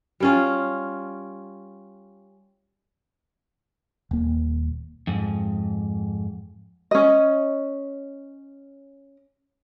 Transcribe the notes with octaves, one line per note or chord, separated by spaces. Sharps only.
G3 C#4 F4
D#1 A#3
F2 G#2
C#4 D#5